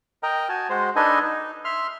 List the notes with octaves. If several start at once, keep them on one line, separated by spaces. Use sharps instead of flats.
A#4 D#5 G5 A#5
F#4 G#5 A5
G#3 F#4 C5
D4 D#4 A4 B4 D#5 G#5
D#4
E5 C6 F6